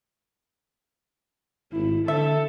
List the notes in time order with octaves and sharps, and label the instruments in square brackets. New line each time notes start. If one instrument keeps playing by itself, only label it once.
[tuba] G#1 [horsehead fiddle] E4
[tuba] D3 [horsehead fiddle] A4 [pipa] E5